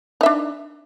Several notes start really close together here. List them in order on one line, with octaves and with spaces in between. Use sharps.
D#4 E5 D4